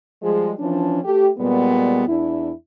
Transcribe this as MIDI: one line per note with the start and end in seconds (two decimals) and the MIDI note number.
0.22 0.53 53
0.22 0.53 55
0.22 0.53 56
0.59 1.00 52
0.59 1.00 53
0.59 1.00 61
0.59 1.00 62
1.04 1.30 57
1.04 1.30 67
1.38 2.05 46
1.38 2.05 55
1.38 2.05 56
1.38 2.05 59
2.08 2.51 40
2.08 2.51 62
2.08 2.51 64